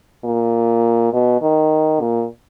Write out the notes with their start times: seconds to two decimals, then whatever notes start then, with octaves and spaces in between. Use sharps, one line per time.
0.25 A#2
1.13 B2
1.42 D#3
2.01 A#2